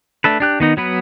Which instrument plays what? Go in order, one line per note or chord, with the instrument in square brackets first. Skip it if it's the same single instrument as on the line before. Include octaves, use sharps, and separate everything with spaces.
[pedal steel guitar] A3 D4 A4 B4
D4 G4 F#6
D#3 B3 D#4
F#3 B3 B4